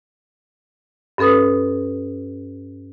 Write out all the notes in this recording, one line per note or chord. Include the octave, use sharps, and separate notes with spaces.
G2 C#4 A4 B4 D#6